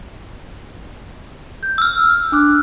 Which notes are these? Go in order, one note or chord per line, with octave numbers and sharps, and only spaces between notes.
G6
E6 F6
D4 D6 F#6